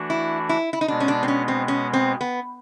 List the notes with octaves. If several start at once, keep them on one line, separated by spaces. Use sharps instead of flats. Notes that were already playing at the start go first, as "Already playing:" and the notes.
Already playing: E3 A3 D4 F#4
E4
E4
E4
D#4
B2 G#3 B3 D4
C#4
D4
C4
C#4
C4
C#4
C4
B3